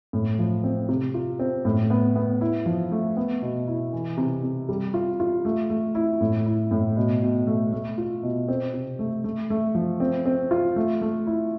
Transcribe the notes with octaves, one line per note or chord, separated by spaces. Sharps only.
A2
F3
C4
C3
F4
C4
A2
B3
B3
E4
F3
A3
B3
B2
E4
E3
C3
C3
G3
F4
F4
A3
A3
E4
A2
E4
A2
B2
B2
A3
A3
F4
B2
C4
C3
A3
A3
A3
F3
C4
C4
F4
A3
A3
E4